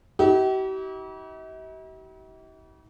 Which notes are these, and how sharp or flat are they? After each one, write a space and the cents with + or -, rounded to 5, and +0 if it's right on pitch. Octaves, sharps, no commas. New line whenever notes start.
E4 -45 G4 -45